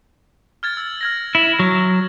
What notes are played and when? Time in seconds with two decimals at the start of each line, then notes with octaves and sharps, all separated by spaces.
0.63 F6 G#6 A6
0.77 E6 A6
1.01 F6 G#6 A#6
1.35 E4
1.59 F#3